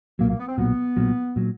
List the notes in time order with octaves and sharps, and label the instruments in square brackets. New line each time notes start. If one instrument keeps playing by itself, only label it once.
[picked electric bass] B1 A#2 F#3 [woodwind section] A#3
[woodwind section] A#3
B3
C4
[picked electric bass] B1 A#2 F#3 [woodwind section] B3
[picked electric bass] B1 A#2 F#3
A#2 F#3